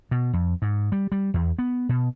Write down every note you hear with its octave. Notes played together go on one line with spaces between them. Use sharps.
B2
F2
G#2
G3
G3
E2
B3
B2